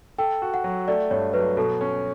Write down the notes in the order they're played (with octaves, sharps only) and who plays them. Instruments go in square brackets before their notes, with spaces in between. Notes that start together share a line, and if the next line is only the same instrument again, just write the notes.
[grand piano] A4 [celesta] G5
[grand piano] F#4
[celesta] F#5
[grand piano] F#3
[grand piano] A3 [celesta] D5
[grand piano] G2 [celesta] C#5
[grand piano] F#3 [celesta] B4
[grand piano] B2 [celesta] A4
[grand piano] C#4